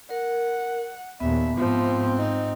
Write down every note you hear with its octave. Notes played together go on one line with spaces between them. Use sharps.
A#4 F#5
D#2 A#2 B3 E5
G#2 F3 C4
D#4